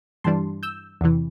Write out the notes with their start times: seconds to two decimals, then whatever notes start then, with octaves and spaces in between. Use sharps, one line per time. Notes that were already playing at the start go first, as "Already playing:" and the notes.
0.24 G2 E3 G3 D4 A5 C6
0.63 E6 G6
1.01 E2 C3 E3